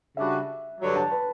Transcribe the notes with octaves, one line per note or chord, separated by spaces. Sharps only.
C#3 G3 D4 F#4 E5
G2 D3 F#3
A5
B4